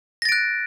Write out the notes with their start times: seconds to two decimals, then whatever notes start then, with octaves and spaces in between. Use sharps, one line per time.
0.22 A#6
0.25 A6
0.29 D7
0.32 F#6